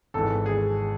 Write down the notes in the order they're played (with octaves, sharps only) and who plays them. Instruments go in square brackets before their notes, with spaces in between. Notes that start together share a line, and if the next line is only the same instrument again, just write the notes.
[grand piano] G#1 G#2 E3 A4
G#4